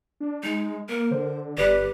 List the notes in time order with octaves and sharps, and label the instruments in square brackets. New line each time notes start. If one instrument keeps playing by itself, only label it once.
[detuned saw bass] D4
[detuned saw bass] G#3 [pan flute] D#4
[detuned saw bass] A#3 [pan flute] A#4
[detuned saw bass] D3 [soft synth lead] C5
[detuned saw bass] G1 [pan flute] G4 [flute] B4 [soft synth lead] D5